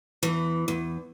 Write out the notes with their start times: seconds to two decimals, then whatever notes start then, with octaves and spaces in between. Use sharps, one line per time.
0.23 E2 E3
0.68 E2